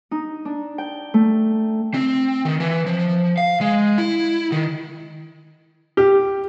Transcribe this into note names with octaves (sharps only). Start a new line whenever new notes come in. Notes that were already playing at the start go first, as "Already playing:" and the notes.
D#4
D4
G5
A3
C4
D#3
E3
F3
F5
G#3
E4
D#3
G4